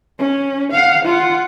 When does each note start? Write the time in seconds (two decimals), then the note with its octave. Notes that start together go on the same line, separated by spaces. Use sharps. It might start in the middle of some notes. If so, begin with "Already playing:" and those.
0.19 C#4
0.72 F5 F#5
1.05 F4 F#5